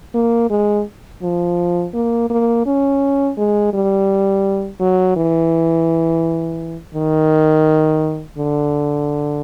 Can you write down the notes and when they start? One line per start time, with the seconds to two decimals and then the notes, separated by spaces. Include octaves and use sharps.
0.14 A#3
0.50 G#3
1.22 F3
1.94 A#3
2.30 A#3
2.66 C#4
3.37 G#3
3.73 G3
4.80 F#3
5.16 E3
6.95 D#3
8.38 D3